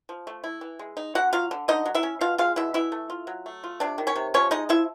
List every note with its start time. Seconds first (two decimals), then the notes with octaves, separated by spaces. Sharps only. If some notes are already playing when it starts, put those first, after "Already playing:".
0.09 F3
0.27 A3
0.44 E4
0.61 E3
0.79 G#3
0.97 D#4
1.15 D3 F#4 F#5
1.33 F#3 F4 F5
1.51 D3
1.68 D3 D#4 D#5
1.86 F#3
1.95 E4 E5
2.03 C#4
2.21 B2 F4 F5
2.38 G#3 F4 F5
2.56 B2 E4 E5
2.74 E3 E4 E5
2.92 A3
3.10 F4
3.27 F#3
3.46 A3
3.64 F4
3.80 C3 D4 D5
3.98 D#3
4.07 C#4 C#5
4.16 C3
4.34 F3 C#4 C#5
4.51 G#3 D#4 D#5
4.69 F3 E4 E5